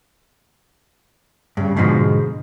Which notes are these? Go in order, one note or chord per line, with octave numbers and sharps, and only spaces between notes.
G2 C#3
G#2 B2 D3 F3 G3 G#3